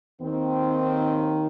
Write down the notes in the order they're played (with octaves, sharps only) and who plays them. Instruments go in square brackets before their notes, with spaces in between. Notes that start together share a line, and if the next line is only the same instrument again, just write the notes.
[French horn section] D#2 D#3 C4